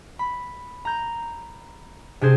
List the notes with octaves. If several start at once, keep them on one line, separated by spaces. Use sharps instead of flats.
B5
A#5 G6
C3 D4 G#4 C5